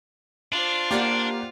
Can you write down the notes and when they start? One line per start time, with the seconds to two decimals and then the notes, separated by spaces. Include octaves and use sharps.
0.52 D4 F4 C5
0.91 A#3 G4 D5 F#5